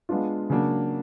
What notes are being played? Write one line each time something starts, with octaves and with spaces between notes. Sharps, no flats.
G#3 B3 D4 F4
C#3 F#3 A#3 D4